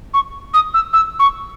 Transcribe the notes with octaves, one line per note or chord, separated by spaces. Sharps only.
C#6
D#6
E6
E6
C#6